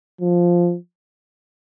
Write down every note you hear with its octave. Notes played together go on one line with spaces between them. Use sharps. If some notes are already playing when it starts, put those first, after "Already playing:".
F3